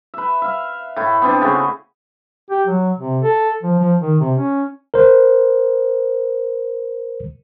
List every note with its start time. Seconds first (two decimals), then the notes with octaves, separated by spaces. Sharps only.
0.14 B4 E5
0.42 E5 F5
0.96 A2 E4
1.22 B3 C4 D4
1.41 C#3 A3 B3 F#4
2.50 G4
2.67 F#3
2.99 C3
3.23 A4
3.63 F3
3.79 F3
4.01 D#3
4.20 C3
4.37 C#4
4.94 A#4 C5